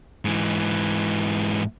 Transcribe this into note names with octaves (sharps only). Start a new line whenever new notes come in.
G#2 E3